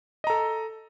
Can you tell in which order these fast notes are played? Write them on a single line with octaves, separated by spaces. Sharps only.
D#5 A#5 A4